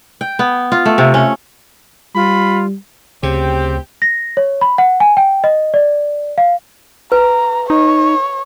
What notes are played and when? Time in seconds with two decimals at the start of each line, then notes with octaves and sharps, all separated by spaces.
0.21 G5
0.39 B3
0.72 F4
0.85 A3
0.98 C3
1.14 C#4
2.15 G3 F4 B5
3.23 D2 C#3 C4 G4
4.02 A#6
4.37 C#5
4.61 B5
4.78 F#5
5.00 G#5
5.17 G5
5.44 D#5
5.74 D5
6.38 F5
7.12 B4 A#5
7.70 D#4 C#5